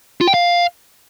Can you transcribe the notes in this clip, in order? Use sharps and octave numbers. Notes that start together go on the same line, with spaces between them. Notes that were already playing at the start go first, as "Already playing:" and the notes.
F4
G5
F5